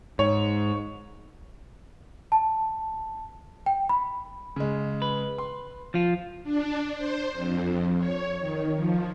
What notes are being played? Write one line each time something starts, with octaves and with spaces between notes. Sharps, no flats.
G#2 C#5
A5
G5
B5
C#3 G#3
B4
C6
F3 F4
D4
C5
F2
C#5
D#3
F3